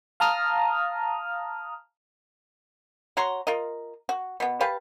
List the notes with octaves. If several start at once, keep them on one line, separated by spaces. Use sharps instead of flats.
F5 A5 A#5 D#6 F6
F#4 C#5 A#5 C6
F4 A#4 D#5
F#4
B2 B3
G4 B4 F5 A5